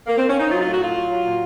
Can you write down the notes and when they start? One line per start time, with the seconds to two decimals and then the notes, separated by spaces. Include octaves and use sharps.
0.07 A#3
0.18 C4
0.29 C#4
0.40 D#4
0.50 F#3 F4
0.61 F4
0.65 A2
0.72 F#4
0.80 F#3 F4
0.95 F#3
1.09 F#3
1.24 A#2